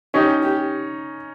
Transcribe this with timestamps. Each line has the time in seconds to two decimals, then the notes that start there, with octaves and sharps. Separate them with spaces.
0.14 C#4 D#4 G4
0.42 G4